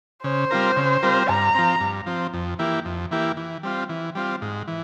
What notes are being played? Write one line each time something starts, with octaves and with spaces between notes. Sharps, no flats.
C#3 C5
G3 C4 F4 A#4
C#3
G3 C4 F4 A#4
G2 A#5
F3 C4
G2
F3 C4
F2
E3 A#3 E4 G4
F2
E3 A#3 E4 G4
E3
G3 C4 F4
E3
G3 C4 F4
G#2
E3